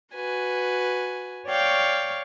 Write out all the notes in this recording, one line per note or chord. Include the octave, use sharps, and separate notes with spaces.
F#4 B4 G#5
C#5 D5 F5 G5 C#6